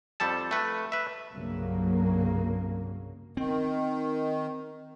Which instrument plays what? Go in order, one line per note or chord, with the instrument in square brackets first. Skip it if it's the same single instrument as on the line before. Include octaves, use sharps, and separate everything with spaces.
[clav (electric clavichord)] F2 G3 A4 A5
A3 B4
B4 E5
[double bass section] C2 G2 C#3 F#3 A#3
[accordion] D#3 [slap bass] C4